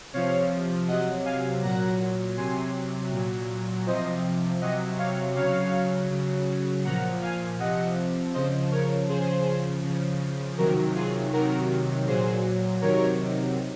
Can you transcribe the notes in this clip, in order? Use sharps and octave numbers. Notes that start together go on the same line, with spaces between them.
C3 F3 C#5 F5
C3 F#3 D#5 F#5
F5 G#5
A#2 F#3 F#5 A#5
C3 F#3 G#5 C6
A#2 F#3
C3 F3 C5 D#5
C3 F#3 D#5 F#5
C#5 F5
C#3 F#3 C#5 F5
C#3 F#3
A#2 F3 F#5 A#5
F5 G#5
C3 F3 D#5 F#5
C#3 F3 C5 D#5
A#4 C#5
C#3 F3 G#4 C5
C#3 F3
C3 D#3 F#3 F#4 A#4
F4 G#4
C3 D#3 F#3 F#4 A#4
A#2 F#3 G#4 C5
C3 D#3 F#3 A#4 C#5